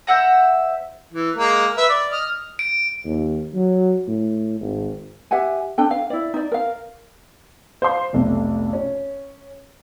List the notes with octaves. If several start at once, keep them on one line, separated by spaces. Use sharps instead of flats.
C5 E5 F#5 A#5
E3
G#3 A#3 A#4
B4 E5
D5
D#5 F6
D7
D#2
F#3
A2
G#1
G4 E5 F#5 G#5
D4 A4 G5
F5
E4 D5
D#4 D5
A#4 F5
C5 F5 C6
F1 B1 A3
C#4